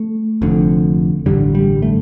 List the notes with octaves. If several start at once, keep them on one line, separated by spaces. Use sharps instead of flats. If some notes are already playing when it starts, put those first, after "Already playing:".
Already playing: A3
F1 F2 D3
A1 G2 D3 G3
G3
A3